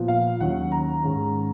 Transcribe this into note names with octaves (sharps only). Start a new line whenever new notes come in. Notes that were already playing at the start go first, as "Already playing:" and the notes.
Already playing: A#2 F3 B3
F5
D#2 D#3 F#3 C#4 F#5
A#5
G#2 D#3 G#3 C#4